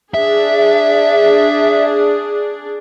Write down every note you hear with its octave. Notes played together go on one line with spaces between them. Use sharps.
D4 G#4 E5